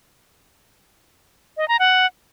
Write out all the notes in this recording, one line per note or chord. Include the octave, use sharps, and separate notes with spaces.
D#5
A#5
F#5